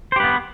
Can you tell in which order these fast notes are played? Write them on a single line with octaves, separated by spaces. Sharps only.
C5 G4 B4 B3